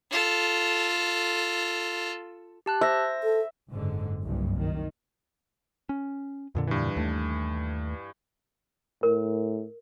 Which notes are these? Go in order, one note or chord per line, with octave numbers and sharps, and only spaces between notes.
F4 A4
G4 A5 F#6
C5 E5 A#6
A4
F#1 G#2 D3
F#1 C2 G2
D#3
C#4
F2 A#2 D3
G2 E3
D#2 A3
A2 A#4